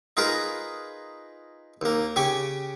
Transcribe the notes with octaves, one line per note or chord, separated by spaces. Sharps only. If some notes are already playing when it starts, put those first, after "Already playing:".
D#4 F4 G#4 A#4 B4
D#2 A#3
C#3 G4 G#5 C#6